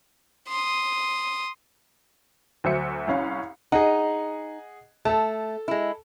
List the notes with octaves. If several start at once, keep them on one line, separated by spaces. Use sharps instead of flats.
C6 D#6
D2 F#3 C5 E5 C#7
C2 C#4 F5
D#4 G#4 D#5 F#5
A3 A4 A5
G#3 E4